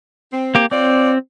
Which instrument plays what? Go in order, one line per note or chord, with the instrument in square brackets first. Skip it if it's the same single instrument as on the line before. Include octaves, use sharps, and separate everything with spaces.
[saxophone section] C4
[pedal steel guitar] A#3 G4
[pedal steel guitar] C4 [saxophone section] F4 C#5 D5